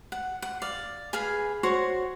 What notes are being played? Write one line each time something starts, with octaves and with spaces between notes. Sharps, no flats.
F#5
F#5
D5 F5
G#4 B4 F5 G#5
F#4 C5 C#5